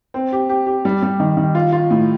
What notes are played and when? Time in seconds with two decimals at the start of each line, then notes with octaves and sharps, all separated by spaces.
0.14 C4
0.33 G4
0.49 G4
0.67 G4
0.85 G3
1.02 G3
1.20 D#3
1.37 D#3
1.55 F4
1.72 F4
1.90 A2